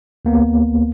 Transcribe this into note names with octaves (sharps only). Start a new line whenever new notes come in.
D2 A#3 B3